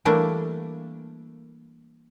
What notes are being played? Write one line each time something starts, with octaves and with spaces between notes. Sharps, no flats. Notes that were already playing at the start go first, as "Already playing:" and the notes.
E3 G3 A3 A#3 D4 E4